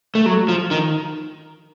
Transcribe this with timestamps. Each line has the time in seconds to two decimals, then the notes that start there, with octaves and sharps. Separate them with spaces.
0.15 A3
0.26 F#3
0.48 F3
0.71 D#3